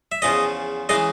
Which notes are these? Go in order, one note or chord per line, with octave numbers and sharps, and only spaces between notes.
E5
E2 C#3 F3 D#5
C#3 E3 G#3 D#5